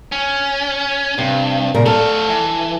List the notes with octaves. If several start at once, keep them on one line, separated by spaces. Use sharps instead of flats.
C#4
G2 C3
A#2 C#3 A#4
A3 A4 F5
E3